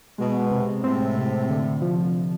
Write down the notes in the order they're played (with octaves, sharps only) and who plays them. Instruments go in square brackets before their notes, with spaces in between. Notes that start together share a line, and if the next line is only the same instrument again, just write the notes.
[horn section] B2 [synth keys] G#3
[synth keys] C3
[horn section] A2 [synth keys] C4
[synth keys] C3
D3
F3